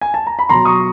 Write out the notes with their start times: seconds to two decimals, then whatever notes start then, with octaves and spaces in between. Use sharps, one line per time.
0.01 G#5
0.14 A5
0.27 A#5
0.39 B5
0.49 B2 F#3 A#5 C6
0.65 C#6 D#6